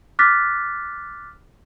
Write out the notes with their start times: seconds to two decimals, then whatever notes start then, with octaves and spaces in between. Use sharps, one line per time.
0.19 D6 F6 F#6 A6 B6